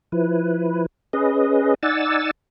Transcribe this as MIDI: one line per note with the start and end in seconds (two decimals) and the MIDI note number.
0.12 0.86 53
0.12 0.86 64
0.12 0.86 71
1.13 1.74 61
1.13 1.74 68
1.13 1.74 71
1.13 1.74 75
1.83 2.31 63
1.83 2.31 74
1.83 2.31 78
1.83 2.31 80
1.83 2.31 88
1.83 2.31 93